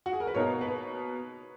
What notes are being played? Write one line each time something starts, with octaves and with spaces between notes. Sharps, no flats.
F#4
G#4
A#4
B4
B2 A#3 D#4 A#4 C#5
B4